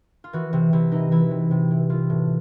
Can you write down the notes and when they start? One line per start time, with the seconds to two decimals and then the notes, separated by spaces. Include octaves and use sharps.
0.24 F4
0.33 E3 F#4
0.53 C3 F#4
0.73 C3 E4
0.92 E3 D#4
1.11 E3 E4
1.31 C3
1.51 C3
1.71 E3
1.90 E3 F4
2.10 A2